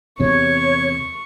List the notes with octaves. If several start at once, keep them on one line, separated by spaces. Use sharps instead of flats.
E2 C3 C#5 C#6